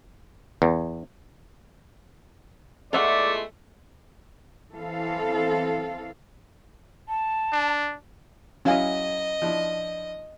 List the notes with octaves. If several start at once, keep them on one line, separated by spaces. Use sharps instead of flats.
E2
E2 G#3 A3 F4 D5 E5 F#5
E3 C4 A4 F5
A5
D4
F#3 C#4 E4 D#5 F5 G#5
F3 D4 E4